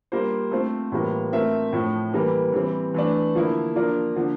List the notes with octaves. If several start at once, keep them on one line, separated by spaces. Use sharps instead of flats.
G3 A#3 F4 C5
A3 C4 F4 C5
A2 E3 G3 A#3 F4
A3 C4 F4 A#4 E5
A2 F3 A3
E3 G3 A#3
E3 G3 C4
E3 A3 D4
D3 F3 A#3 E4
F3 A#3 D4 F4 A#4
D3 F3 A#3